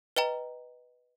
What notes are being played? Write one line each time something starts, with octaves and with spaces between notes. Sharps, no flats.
B4 D#5 G5 A#5